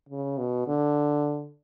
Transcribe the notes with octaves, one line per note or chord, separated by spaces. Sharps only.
C#3
B2
D3